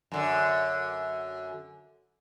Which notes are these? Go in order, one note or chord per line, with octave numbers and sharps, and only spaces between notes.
F#2 D3